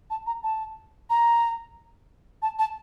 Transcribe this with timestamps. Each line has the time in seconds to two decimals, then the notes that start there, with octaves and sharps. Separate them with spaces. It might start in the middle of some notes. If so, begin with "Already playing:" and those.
0.10 A5
0.27 A#5
0.43 A5
1.10 A#5
2.42 A5
2.59 A5